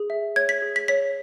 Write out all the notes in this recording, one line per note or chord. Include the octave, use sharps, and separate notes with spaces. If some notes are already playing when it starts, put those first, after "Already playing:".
Already playing: G#4
E5
C#5 G#6
B6
G#4
B6
C#5 B6